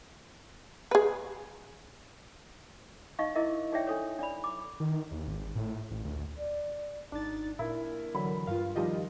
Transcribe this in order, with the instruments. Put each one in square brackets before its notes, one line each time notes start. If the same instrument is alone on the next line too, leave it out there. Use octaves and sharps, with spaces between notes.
[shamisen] G#4 B4
[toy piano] D#4 D#5 F5 C#6
E4 G#4 A#4 D#5 E5
D#4 G#4 C#5 D5 E5 G5
D4 A4 C#5
D4 D5 B5
D6
[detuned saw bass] D#3
D#2
G#1
A2
A1
D2
[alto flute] D5
[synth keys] G#1 A6 [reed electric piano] D4 [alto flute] D#4
[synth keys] A#2 [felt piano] E4 [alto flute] A#4
[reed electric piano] D3 E3 F#3 [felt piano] B5
[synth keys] G2 F4 [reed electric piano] F5
[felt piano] D#3 F3 G3 [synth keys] F4 G4 D#5